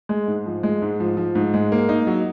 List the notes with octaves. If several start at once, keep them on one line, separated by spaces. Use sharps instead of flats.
G#3
G#2
F3
G#3
G#2
F3
F3
G#2
G#3
A#3
D#4
F#3